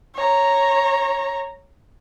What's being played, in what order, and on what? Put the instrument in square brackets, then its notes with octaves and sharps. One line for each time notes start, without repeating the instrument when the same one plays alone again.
[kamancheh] C#5 A#5